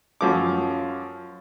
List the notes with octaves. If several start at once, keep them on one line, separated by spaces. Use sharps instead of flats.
F#2 F3 D6